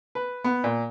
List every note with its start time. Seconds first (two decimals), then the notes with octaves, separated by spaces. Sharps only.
0.15 B4
0.44 B3
0.64 A#2